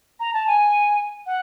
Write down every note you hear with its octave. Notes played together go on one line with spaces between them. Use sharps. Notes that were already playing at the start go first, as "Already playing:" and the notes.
A#5
A5
G#5
F#5